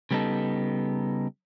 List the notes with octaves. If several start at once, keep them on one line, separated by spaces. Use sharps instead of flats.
C#3 G3 B3 C#4 D#4 A4